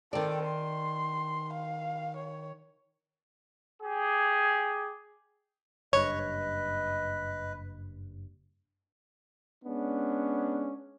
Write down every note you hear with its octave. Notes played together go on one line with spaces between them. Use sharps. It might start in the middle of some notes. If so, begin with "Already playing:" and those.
D#3 C4 A4 D5
C6
F5
C#5
G4 G#4
F#1 G2 B4 C#5 D#5
G#3 B3 C#4 D4